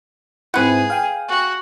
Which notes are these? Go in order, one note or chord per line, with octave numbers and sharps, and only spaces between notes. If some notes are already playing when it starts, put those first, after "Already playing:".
G#2 C4 E4 G#4 B4 F#5
F5 G5 G#5
F#4